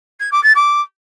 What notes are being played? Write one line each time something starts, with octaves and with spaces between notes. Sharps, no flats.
G#6
D6
A6
D6